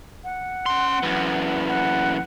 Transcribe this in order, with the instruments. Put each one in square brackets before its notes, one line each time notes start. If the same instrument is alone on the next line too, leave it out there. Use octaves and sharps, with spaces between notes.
[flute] F#5
[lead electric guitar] C#4 C6
F#2 E3
[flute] F#5